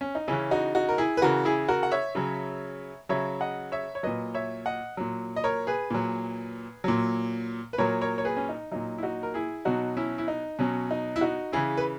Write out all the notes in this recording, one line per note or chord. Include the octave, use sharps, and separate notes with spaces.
C#4
D#4
C#3 E3 C#4 E4
D#4 F#4
D#4 F#4
A#4
E4 G#4
B4
C#3 E3 F#4 A#4
E4 G#4
F#4 A#4
F#5
C#5 E5
C#3 F#3
C#3 F#3 C#5 E5
D#5 F#5
C#5 E5
C#5
A#2 F#3 B4 D#5
C#5 E5
D#5 F#5
A#2 F#3
D#5
A#4 C#5
G#4 B4
A#2 F#3
A#2 F#3
B4
A#2 F#3 A#4 C#5
A#4 C#5
C#5
G#4 B4
C#4
D#4
A#2 F#3 D#4
E4
D#4 F#4
A#4
E4 G#4
B2 F#3 D#4 F#4
C#4 E4
E4
D#4
B2 F#3 C#4
D#4
E4
D#4 F#4
C#3 E3 E4 G#4
B4